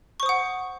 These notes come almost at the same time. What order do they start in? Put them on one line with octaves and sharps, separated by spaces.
C#6 C5 D#6 F#5